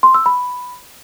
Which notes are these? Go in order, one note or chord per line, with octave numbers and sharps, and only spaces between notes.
C6
E6
B5